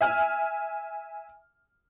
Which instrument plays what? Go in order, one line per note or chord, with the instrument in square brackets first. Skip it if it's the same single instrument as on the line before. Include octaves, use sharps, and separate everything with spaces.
[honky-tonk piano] E5 G#5 F6